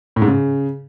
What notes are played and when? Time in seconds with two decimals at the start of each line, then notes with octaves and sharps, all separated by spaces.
0.16 A2
0.22 G#2
0.27 C#3